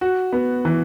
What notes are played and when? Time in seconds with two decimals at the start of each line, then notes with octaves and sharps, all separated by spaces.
0.01 F#4
0.33 B3
0.65 E3